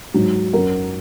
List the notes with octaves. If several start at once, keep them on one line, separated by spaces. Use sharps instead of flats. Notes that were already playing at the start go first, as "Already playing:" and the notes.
G#2 F#3
F#2 F#3 F#4 A#4